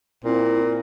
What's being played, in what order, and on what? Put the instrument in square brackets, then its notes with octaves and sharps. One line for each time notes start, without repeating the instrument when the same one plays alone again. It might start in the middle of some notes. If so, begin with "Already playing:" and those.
[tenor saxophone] A#2 [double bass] C4 [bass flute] E4